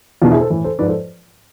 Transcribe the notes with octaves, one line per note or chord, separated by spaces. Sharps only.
E2 B2 D4 F4
E4 G#4
A4 C5
A2 E3
A4 C5
G#2 F3 B4 D5
A4 C5